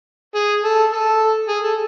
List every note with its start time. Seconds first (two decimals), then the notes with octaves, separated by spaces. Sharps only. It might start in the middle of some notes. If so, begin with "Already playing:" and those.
0.35 G#4
0.64 A4
0.92 A4
1.48 G#4
1.64 A4